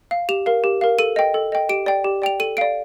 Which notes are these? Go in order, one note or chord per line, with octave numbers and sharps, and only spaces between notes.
F5
G4 F7
A#4 F5
G4
A#4 F5
A4 D#7
D#5 G5
A4
D#5 G5
G4 D7
D5 G5
G4
D5 G5 F7
A4 D#7
D5 F5 D7